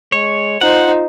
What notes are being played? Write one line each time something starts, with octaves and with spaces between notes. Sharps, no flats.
G#3 C#5
D#4 F4 C5 F#5